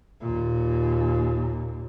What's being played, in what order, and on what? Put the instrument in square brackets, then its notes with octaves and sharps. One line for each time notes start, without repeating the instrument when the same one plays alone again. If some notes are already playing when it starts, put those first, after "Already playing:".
[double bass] D#2 A#2